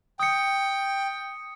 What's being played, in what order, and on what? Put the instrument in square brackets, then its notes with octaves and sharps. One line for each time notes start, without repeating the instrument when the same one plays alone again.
[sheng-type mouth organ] G5 [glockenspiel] D#6 C#7